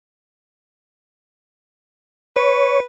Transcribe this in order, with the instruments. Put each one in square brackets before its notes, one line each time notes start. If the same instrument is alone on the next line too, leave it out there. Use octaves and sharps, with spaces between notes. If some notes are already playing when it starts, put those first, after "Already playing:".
[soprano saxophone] B4 [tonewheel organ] C#5